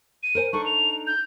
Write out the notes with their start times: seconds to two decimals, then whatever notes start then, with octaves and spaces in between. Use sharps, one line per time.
0.23 D#7
0.35 A#4 C5 G#5
0.53 D4 D#4 A4 C#6
0.66 F7
1.07 G6